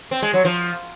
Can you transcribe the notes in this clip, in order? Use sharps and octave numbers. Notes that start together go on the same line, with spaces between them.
C4
G#3
F#3
F3